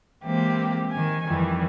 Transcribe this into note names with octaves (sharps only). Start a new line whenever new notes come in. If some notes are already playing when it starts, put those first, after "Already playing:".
E3 G#3 A#3 C4 G4
D#3 G#5
F2 D#3 E3 G3